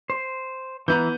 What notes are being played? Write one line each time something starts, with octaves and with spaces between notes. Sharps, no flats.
C5
E3 B3 E4 A#5 G6